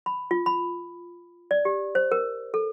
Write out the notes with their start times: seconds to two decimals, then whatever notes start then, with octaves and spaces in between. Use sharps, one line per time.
0.06 B5
0.31 F4
0.46 B5
1.51 D5
1.65 G4
1.95 C5
2.12 A#4
2.54 A4